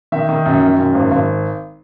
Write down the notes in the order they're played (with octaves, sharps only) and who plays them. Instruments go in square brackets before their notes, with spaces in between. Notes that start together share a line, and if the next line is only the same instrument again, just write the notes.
[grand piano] D#3 E5
D#3
F#2
D#3
F#2
G#1
G#1